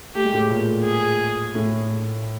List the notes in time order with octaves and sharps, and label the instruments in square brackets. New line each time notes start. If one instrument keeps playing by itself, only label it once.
[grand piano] A3 [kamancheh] G4
[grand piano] G#3
A2 A3
A#2 A#3
[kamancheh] G#4
[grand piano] A2 A3